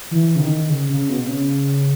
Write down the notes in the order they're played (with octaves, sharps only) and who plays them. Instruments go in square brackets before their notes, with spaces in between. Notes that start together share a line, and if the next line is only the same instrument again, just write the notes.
[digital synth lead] E3
C#3
D#3
C#3
C#3
B2
B2
C#3